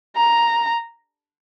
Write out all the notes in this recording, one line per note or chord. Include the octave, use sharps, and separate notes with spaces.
A#5